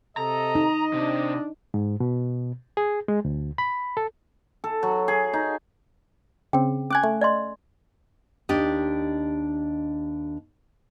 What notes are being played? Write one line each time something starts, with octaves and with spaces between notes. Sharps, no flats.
C3 A4 D#5 A#5
D#4
C3 D4
G#2
B2
G#4
G#3
D2
B5
A4
A4
F#3
G#4
D#4
C#3 C4 G#4 G5
C#4 G#5 D6 F#6 G#6
A3
D5 D#5 C6
D#2 D4 G4 D#5